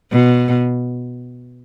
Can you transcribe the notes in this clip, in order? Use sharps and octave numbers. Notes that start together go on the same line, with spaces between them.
B2